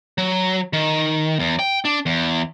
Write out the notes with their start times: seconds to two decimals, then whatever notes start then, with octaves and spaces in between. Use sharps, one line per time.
0.18 F#3
0.73 D#3
1.39 E2
1.59 G5
1.85 D4
2.06 E2